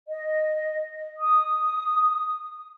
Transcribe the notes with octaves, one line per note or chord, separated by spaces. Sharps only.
D#5
D#6